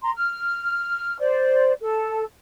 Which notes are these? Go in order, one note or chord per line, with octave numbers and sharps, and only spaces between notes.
A#5 C6
F6
C5 D5
A4